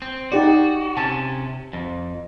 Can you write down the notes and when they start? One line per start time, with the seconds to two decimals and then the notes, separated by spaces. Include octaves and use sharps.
0.02 C4
0.32 D#4 F#4 G4 D5
0.97 C3 C#4 A5
1.73 F2